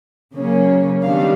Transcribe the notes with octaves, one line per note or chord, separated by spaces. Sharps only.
C#3 F#3 A#3 C#4
D#3 G3 B3 D4 F5